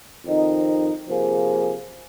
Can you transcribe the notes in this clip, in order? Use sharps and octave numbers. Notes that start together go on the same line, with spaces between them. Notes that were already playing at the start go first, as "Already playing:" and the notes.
F2 D#3 C4 D#4
C3 F3 A#3 G#4 C5